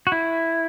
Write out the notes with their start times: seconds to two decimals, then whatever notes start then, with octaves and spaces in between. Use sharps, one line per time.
0.07 F#4
0.12 E4